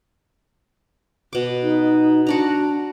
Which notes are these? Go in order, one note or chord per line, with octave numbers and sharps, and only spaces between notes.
B2 D6
D#4
D4 F#4 D5 A#5